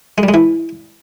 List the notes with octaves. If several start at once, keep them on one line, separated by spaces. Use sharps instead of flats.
G#3
G3
G#3
E3